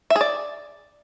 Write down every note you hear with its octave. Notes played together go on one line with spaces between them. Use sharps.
E5
G#4
D5